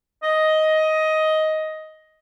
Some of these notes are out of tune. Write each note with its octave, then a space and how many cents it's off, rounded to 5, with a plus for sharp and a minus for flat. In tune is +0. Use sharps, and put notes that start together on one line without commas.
D#5 +10